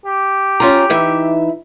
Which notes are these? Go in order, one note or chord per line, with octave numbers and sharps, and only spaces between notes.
G4
C#4 F4 A#5
E3 D#4 E5